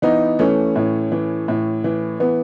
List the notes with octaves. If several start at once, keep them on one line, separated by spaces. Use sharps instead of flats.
E3 B3 D#4
E3 A3 C#4
A2
E3
A2
E3
E3 B3